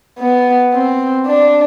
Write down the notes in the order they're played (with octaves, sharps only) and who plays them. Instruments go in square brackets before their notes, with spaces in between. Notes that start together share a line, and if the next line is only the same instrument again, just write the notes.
[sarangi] B3
C4
D4